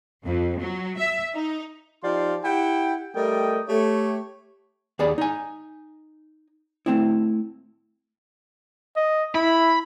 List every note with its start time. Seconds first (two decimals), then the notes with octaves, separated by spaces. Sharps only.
0.24 F2
0.59 F#3
0.97 E5
1.34 D#4
2.03 F3 D#4 G4 D5 F5 C6
2.44 E4 G4 F#5 G5
3.16 G3 A3 A#4 D5 D#5 G5
3.68 A3 G4 C#5
4.99 D#2 G#4 D5 B5
5.18 D#4 G#5
6.86 A3 C4 E4
8.96 D#5
9.35 E4 B5